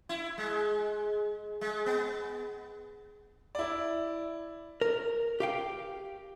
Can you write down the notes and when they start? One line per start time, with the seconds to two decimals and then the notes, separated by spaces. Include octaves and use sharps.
0.09 E4
0.38 G#3
1.61 G#3
1.86 B3
3.55 E4 D5
4.81 A#4
5.40 G4 F5 G5